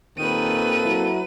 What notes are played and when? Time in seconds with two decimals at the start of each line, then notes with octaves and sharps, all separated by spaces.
0.18 D#2 A#2 D#3 A#3 C4 A4 B4 D#7
0.84 F#3 E4